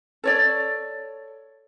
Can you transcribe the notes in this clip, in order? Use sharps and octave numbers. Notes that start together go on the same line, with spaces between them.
A4 C#5 D5